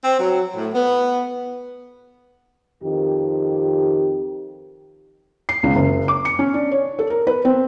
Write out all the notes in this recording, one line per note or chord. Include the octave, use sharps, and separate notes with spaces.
C4
F#3
A2
B3
F2 D#3 G4
C7
C#2
F#1
D6
C#7
C#4
D4
C#5
A4
A#4
B4
C4